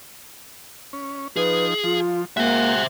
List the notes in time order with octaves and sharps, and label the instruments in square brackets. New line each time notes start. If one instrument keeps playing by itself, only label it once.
[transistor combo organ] C#4
[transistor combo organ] F3 D#4 [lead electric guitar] G#4 [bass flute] B4
[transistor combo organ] F3 [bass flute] F4
[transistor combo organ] G#3 F#4 F#5 [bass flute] A#3 [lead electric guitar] C5 E5